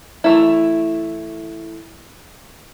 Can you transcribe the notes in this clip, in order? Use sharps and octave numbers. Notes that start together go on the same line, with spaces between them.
E3 A3 E4